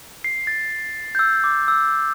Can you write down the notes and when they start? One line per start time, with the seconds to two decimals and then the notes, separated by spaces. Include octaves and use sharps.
0.24 C7
0.47 A6
1.15 G6
1.19 E6
1.44 D6
1.68 E6